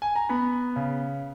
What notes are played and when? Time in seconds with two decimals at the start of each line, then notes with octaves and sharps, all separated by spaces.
0.02 G#5
0.15 A#5
0.29 B3 B5
0.76 C#3